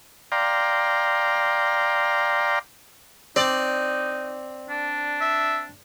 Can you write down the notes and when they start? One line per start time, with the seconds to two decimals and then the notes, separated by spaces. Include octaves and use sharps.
0.32 D5 F5 G5 A#5 C6
3.36 C4 D#4 D5
4.69 D4
5.21 E5